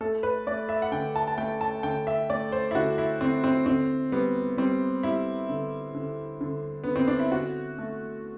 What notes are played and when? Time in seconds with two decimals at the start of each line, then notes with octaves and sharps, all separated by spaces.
0.01 A3 A4
0.23 B4
0.47 A3 D5
0.69 E5
0.82 F#5
0.92 D3 G5
1.16 A5
1.28 A5
1.38 A3 G5
1.61 A5
1.83 D3 G5
2.07 E5
2.30 A3 D5
2.52 C5
2.71 E4
2.75 D3 F#4
2.98 E4
3.21 D3 C4
3.44 C4
3.66 D3 C4
4.12 G3 B3
4.57 G3 C4
5.03 G3 E4
5.49 D3
5.94 D3
6.41 D3
6.84 D3 B3
6.96 C4
7.07 D4
7.19 E4
7.32 D3 F#4
7.78 A3